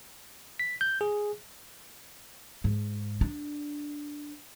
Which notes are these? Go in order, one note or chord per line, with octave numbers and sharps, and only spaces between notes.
B6
G6
G#4
G#2
D4